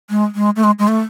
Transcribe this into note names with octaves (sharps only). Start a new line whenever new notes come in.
G#3
G#3
A3
G#3
G#3
A3